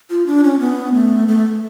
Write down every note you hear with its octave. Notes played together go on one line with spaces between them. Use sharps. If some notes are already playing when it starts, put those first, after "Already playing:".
F4
D4
C#4
B3
A3
A3